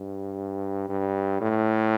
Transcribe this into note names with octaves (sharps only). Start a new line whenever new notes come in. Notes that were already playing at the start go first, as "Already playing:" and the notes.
Already playing: G2
G2
A2